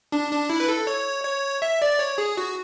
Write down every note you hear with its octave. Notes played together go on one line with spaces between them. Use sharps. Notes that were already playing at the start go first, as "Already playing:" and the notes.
D4
D4
E4
B4
A4
C#5
C#5
E5
D5
C#5
G#4
F#4